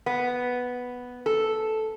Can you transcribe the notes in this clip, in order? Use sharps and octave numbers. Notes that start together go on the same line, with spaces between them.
B3
A4